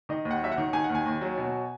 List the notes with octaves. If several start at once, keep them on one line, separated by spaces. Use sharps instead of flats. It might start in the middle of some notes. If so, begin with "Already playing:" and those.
D#3 D#5
D#2
F#5
F#3 E5
F#5
D#3
D#3 G#5
F#5
D#2
G#5
D#2
F#3
B2